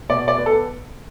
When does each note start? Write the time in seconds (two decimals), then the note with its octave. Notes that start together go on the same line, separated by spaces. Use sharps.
0.09 B2 D5
0.28 D5
0.37 B3
0.46 A4